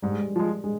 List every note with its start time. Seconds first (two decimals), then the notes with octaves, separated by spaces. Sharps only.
0.02 G#2 G3
0.12 G#3
0.22 G3
0.36 F3 G#3
0.64 G#3